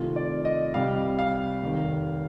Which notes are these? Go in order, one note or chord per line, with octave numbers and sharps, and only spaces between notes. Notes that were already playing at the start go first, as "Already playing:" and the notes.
Already playing: C2 C3 D#3 A3 F4
D5
D#5
C2 C3 G3 F5
F5
F1 D#2 D#3